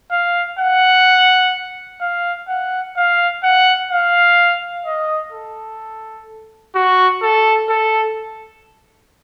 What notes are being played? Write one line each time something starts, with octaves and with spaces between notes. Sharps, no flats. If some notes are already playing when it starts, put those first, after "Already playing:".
F5
F#5
F5
F#5
F5
F#5
F5
D#5
A4
F#4
A4
A4